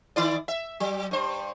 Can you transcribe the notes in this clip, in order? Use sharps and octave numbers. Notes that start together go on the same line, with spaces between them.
D#3 E4 D5
E5
F#3
G2 C5